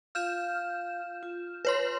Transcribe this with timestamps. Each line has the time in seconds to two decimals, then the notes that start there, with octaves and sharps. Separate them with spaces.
0.15 F4 F5 F6 G6 E7
1.23 F4
1.65 B4 C#5 C6